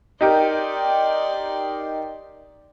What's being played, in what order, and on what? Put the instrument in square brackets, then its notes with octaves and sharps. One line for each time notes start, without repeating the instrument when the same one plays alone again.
[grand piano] D#4 G4 A#4 [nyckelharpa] D5 C6